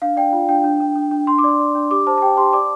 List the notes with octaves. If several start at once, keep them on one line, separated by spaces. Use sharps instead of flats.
D4 F5
D5 G5
F4
D4 G5
D4
D4
D4
D4
D4 C6
D6
D5 C6
D5
D4
G4 D6
C5 A5
A5
G4 G5
G4 C6
D5 D6